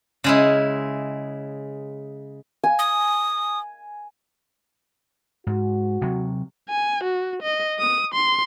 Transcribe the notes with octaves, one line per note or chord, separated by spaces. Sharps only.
C#3 G#3 E4
G#5
D#6
G#2 F#4
C3 F#3
G#5
F#4
D#5
D#6
C6